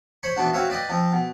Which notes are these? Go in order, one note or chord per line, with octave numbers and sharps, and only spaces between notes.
C5 C#5 B5 C#6
E3 B3 D4 F#4
C4 F#4 B4 C#5 E5 F5
B4 D5 D#5 G5
F3 C4
B2